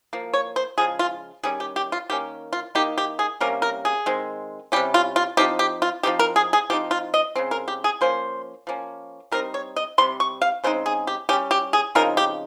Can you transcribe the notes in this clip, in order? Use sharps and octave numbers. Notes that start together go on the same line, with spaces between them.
F3 A#3
C#5
C5
C#3 F3 G#3 G#4
F4
D#3 G3 C#4 G#4
G4
G4
F4
D#3 A#3 C#4 G4
F4
D#3 A#3 D#4 G4
G4
G#4
C3 G3 A#3 C#4 A#4
A#4
G#4
D#3 G#3 C4
C3 G3 C#4 G4
F4
F4
F3 G#3 C4 D#4 G4
G4
F4
F3 G#3 C4 D#4 G4
A#4
G#4
G#4
F3 C4 D#4 G4
F4
D#5
C#3 G#3 C4
A#4
G4
G#4
F3 A#3 C#4 C5
F3 A#3 C#4
G3 C4 D#4 A#4
C#5
D#5
C3 D#3 G3 C4 C6
C#6
F5
C#3 G#3 C4 D#4 C5
G#4
G4
G3 C#4 G4
G4
G#4
C#3 F3 C4 D#4 A#4
G4